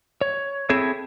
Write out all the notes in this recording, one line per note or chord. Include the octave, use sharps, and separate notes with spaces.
C#5
C4 E4 G#4 A4 C#5